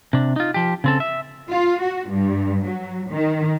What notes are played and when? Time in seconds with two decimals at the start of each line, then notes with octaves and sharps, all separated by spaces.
0.13 C3 D4
0.36 D#4 F4
0.54 F3 G4
0.84 C#3 C4 A4
1.00 E5
1.50 F4
1.80 F#4
2.10 G2
2.65 F#3
3.11 D#3